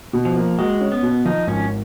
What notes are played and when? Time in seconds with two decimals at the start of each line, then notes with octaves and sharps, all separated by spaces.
0.13 B2
0.25 F3
0.37 A#3
0.58 G#3 F#4
0.81 C#4
0.92 B3
1.03 B2
1.25 F3 D#4
1.47 G#1 C#4